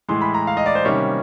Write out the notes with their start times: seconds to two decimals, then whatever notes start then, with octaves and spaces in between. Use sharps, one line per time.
0.09 A2 E3 G#3 C6
0.21 B5
0.34 A#5
0.47 F5
0.57 D#5
0.66 D5
0.75 C5
0.85 C3 D#3 G3 A#3 C#4 C#5